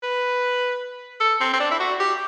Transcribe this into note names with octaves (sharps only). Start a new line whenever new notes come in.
B4
A4
C4
C4
D4
E4
F#4
G4